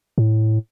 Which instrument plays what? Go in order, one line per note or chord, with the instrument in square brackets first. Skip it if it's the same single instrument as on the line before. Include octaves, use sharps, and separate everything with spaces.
[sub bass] A2